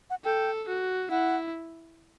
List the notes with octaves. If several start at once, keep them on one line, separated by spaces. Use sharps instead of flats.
F#5
A4 G5
F#4
E4 F#5